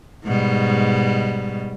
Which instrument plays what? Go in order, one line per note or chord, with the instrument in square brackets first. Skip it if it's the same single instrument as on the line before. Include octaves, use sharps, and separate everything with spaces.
[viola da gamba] G#2 B2 G3